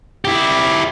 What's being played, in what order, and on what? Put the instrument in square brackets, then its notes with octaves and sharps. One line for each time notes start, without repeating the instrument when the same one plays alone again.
[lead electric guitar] E4 G4